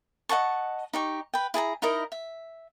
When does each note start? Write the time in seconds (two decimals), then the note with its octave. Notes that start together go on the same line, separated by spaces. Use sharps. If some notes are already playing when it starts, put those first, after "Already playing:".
0.29 D#5 F#5 A5 C#6
0.93 D#4 G4 C#6
1.34 B4 G5
1.54 E4 G#4 A5 A#5
1.82 D#4 E4 A#4 D#5
2.12 E5